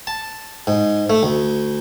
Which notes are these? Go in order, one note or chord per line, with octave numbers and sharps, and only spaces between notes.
A5
G#2
A3
D2